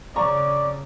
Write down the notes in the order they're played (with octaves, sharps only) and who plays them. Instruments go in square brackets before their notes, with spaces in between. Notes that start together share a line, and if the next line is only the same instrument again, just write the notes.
[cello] C#3 [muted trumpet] D5 [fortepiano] A#5 C#6